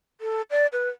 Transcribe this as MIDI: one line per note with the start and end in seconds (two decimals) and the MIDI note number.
0.21 0.42 69
0.51 0.67 74
0.73 0.89 71